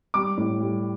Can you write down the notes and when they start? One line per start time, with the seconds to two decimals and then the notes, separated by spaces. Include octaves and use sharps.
0.14 G3 D6
0.38 A2
0.60 G3